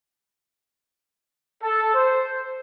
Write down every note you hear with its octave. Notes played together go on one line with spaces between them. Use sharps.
A4
C5